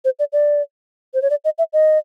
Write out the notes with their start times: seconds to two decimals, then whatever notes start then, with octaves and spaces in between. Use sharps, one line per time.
0.05 C5
0.19 D5
0.33 D5
1.14 C5
1.22 C#5
1.30 D5
1.45 D#5
1.58 E5
1.73 D#5